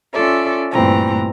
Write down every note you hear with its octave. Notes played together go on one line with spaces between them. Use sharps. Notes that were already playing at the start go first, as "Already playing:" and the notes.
C#4 F4 A4 D5 E5
D2 G2 A#2 E3 C4 A#5